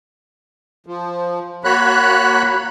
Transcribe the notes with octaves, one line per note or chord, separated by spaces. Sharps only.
F3
A#3 F#4 C#5 B5 F#6